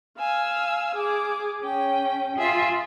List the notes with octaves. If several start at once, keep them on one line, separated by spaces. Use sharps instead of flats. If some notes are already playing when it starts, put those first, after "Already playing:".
F5 G#5 E6
G#4 D6
C#4 G5
F4 G#4 E5